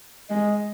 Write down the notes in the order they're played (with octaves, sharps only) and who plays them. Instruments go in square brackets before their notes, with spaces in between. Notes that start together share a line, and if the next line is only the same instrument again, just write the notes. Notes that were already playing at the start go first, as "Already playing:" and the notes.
[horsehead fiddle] G#3 [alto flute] D#5